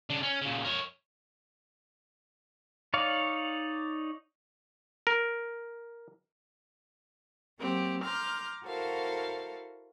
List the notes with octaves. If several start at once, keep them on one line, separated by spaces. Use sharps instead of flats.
C#3 D4
C#4
A#2 C#3
A#4 C#5
D#4 C#5 D5 F5
A#4
F#3 A#3 C4 G4
A#5 C6 D6 F6 G6
E4 F#4 A4 A#4 C5 F5